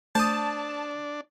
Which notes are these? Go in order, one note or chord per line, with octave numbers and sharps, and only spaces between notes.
A3 D4 C5 A5 D#6